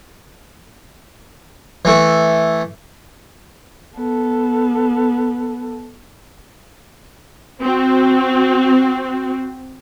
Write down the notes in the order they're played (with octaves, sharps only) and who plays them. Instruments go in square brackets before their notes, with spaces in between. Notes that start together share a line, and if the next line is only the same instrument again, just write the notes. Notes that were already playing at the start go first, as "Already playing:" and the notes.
[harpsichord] E3 A3
[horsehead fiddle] B3 A4
[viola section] C4 F#4